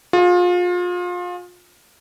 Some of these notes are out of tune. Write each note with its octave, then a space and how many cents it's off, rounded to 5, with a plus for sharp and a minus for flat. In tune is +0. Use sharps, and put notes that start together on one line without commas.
F4 +30 G#4 +0